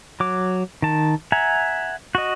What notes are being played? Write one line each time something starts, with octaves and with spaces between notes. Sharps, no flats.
F#3 D6
D#3 A5
E5 F#5 G#5 A#5
F#4 D#5